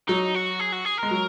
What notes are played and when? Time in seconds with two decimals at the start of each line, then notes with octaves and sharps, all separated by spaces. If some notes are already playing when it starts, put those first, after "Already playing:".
0.08 F#3 D#4
0.35 F#4
0.60 G#4
0.72 F#4
0.85 G#4
0.98 A#4
1.03 G#3
1.11 F#3